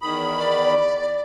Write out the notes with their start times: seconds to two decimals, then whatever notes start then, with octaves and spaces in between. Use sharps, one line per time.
0.02 E2 D#3 B5 D#6
0.38 D5